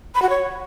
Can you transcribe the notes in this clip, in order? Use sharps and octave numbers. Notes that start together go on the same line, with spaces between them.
B5
F#4
C#5